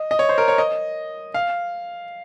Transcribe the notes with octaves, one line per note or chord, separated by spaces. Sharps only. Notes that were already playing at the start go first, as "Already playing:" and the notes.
Already playing: D#5
D#5
C#5
C5
A#4
C#5
D#5
F5